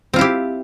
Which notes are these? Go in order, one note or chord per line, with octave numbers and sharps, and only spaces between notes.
C4 E4 F4 G4